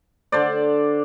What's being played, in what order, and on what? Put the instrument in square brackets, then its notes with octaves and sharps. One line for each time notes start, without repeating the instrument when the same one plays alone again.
[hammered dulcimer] D3 C5 D5